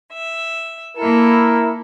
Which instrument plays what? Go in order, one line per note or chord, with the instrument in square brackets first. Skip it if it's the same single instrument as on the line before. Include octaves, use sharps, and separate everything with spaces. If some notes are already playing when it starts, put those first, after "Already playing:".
[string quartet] E5
[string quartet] A#3 A4 [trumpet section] E4 A#4